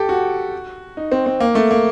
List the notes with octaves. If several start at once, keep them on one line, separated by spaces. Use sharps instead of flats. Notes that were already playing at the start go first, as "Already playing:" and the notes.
Already playing: G4 A4
F#4
D#4
C4
C4
A#3
A3
A#3